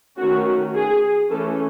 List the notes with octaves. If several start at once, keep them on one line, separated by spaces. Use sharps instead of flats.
D#3 A3 C#4 F#4
G#4
E3 A3 C#4 A4